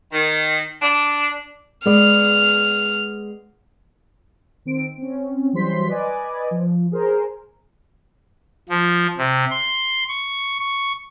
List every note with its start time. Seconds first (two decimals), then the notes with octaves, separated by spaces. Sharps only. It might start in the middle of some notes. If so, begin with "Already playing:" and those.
0.13 D#3
0.82 D4
1.86 G#3 B3 D5 F6
4.65 D#3 C4 D7
4.98 C4 C#4
5.53 E3 F#3 G3 C5 C6 B6
5.88 B4 D5 D#5 G#5
6.51 F3
6.92 G#4 A#4 C5
8.69 F3
9.18 C3
9.51 C6
10.09 C#6
10.60 C#6